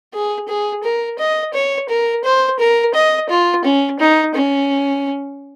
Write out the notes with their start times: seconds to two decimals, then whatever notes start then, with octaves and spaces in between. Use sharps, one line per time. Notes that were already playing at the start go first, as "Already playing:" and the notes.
0.13 G#4
0.48 G#4
0.83 A#4
1.19 D#5
1.53 C#5
1.89 A#4
2.24 C5
2.59 A#4
2.94 D#5
3.29 F4
3.64 C#4
3.99 D#4
4.34 C#4